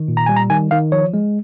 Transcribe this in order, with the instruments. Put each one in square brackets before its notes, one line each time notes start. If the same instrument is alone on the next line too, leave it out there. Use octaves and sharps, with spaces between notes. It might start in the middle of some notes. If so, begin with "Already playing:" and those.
Already playing: [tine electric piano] D#3
A#2
A#5
G3 G#5
A#5
D#3 G#5
D#3 F5
F3 C#5
G#3